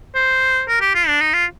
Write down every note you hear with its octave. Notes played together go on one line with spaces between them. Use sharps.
C5
A#4
G4
F4
D4
D#4
F4